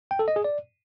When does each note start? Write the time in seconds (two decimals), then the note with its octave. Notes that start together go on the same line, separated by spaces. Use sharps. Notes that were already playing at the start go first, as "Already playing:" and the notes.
0.11 G5
0.19 A4
0.28 D#5
0.36 G#4
0.44 D5